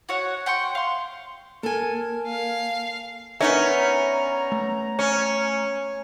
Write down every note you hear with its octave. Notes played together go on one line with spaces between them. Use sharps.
F#4 C#5 F#5
F#5 G5 C6 C#6
F5 C6
A#3 A4 A#4 G#5
F5
B3 C#4 D#4 A#4 C#5 D5 E5 A#5
A3
C#4